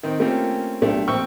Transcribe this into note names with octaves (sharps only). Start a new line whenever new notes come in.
D#3 C4
A3 A#3 C4 C#4 F4 G4
B1 A3 D4 G4
A#1 C4 C5 G5 C#6 E6